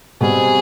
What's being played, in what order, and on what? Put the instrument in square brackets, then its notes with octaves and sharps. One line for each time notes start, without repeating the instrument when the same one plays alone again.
[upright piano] B2 G3 C4 [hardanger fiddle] G#4